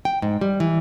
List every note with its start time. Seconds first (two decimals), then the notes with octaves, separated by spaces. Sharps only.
0.05 G5
0.22 G#2
0.41 G3
0.60 E3